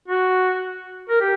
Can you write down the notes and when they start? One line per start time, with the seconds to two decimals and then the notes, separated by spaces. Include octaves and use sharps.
0.08 F#4
1.10 A#4
1.21 G4